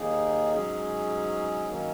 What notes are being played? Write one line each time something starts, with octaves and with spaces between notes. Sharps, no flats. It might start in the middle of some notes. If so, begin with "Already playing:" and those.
Already playing: D#2 D#3 A#3 D#4 G#4
G#2 F#3 C#4 G#4
D#3 F#3 A#3 C#4